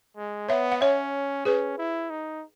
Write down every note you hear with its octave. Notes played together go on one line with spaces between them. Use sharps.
G#3
B3 C#5 E5
F#5
C#4 C#5 E5
C#4 G#4 B4
E4
D#4